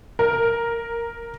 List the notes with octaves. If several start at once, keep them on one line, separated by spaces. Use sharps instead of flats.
A#4